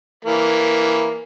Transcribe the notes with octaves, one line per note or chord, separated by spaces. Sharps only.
E3 A#3